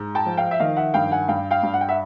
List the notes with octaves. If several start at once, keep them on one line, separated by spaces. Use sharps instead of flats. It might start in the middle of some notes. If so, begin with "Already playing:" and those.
Already playing: G#2
G5 A5
F3
F5 G5
E5
D#3 D#5 F5
E5 F#5
G2 F5 G5
F#5 G#5
G2 F5 G5
F5 G5
G2
F#5
G5
E5 F#5